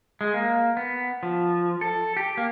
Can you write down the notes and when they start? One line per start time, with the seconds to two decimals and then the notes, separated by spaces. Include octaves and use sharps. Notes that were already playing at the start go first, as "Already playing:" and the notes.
0.21 G#3
0.34 A#3
0.77 B3
1.23 F3
1.81 A4
2.17 G4
2.37 A#3